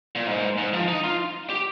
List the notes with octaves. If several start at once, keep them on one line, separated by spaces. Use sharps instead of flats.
A#2
G#2
G#2
F3
D#4
F4
G4